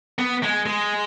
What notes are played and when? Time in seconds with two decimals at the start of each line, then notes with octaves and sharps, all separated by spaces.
0.19 B3
0.43 G#3
0.66 G#3